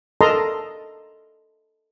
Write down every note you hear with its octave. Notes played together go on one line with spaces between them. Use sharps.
A4 A#4 D#5 A5 A#5 C6